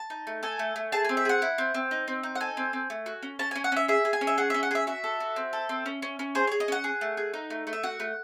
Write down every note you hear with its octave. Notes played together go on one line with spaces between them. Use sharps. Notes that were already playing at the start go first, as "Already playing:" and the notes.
Already playing: A5
D#4
A3
A4 G#5
A3
A3
G#4 A5
C4 G#5
E5
G#4 F#5
E4
C4
C4
D#4
C4
D#4
F#5
A4 G#5
C4
C4
A3
F#4
C#4
C#4 A5
C#4 G#5
F#5
C#4 E5
G#4 E5
G#4
G#5
C#4
E5
G#4 F#5
C#4 E5
F#5
G#4 E5
F#4 E5
A4
F#4
C4
A4
C4
C#4
C#4
C#4
G#4 C5
G#4 C#5
D#5
C#4 F#5
G#4
A3
G#4
D#4
A3
A3
E5
F#4 F#5
A3